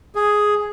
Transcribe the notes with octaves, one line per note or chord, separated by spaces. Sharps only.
G#4